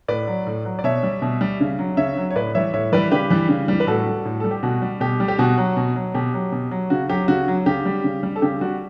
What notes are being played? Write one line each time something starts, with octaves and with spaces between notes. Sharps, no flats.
A2 B4 D5
F#3
A2
F#3
D5
B2 C#5 E5
G3
B2
G3
C#3
F#3
C#3 C#5 E5
F#3
C#5
A2 B4 D5
E3 G3 C#5 E5
A2 C#5 E5
E3 G3 B4 D5
C#3 G4 B4
E3 G3
C#3
E3 G3
B4
A2 F#4 A4
G3
A2
G3 A4
G4
B2 F#4
G3
B2 G4
G3
G4
B2 F#4
F#3
B2
F#3
B2 G4
F#3
B2
F#3
C#3 F#4
F#3 G4
C#3 F#4
F#3
C#3 G4
G3
C#3
G3
A4
C#3 G4
G3 F#4